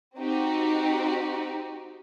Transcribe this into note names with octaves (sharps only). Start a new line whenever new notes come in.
C4 D#4 F#4 G4